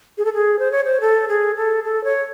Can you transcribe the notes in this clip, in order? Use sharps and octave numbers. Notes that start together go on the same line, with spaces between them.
G#4
A4
G#4
C5
C#5
C5
A4
G#4
A4
A4
C#5